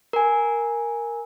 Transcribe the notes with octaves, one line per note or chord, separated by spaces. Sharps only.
A#4 G#5